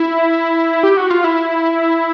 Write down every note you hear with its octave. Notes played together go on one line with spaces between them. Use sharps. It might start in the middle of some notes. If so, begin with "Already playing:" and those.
Already playing: E4
G4
F#4
F4
E4